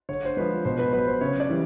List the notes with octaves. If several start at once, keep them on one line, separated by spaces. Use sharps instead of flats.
D3 C#5
C5
F3 G#3 B4
B2 C5
B4
F#3 B4
C5
C#3 C#5
D5
E3 G3